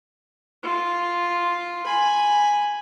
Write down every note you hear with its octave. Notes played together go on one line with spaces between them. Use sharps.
F4
G#5 B5